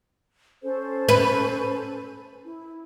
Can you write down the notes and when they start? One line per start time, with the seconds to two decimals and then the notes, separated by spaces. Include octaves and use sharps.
0.62 C#4 A4 C5
1.09 B4
2.45 E4